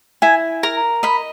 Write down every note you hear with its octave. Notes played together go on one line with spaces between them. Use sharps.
E4 G#5
A#4 A#5
D#5 B5